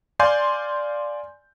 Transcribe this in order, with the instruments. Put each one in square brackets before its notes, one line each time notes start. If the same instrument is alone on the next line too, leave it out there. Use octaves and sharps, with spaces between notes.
[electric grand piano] D5 F5 G#5 C6 G6